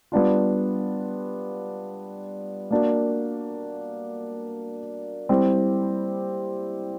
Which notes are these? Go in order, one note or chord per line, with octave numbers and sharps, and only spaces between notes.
G3 B3 D4 F4
A#3 D4 F#4 A#4
G3 C4 E4 G4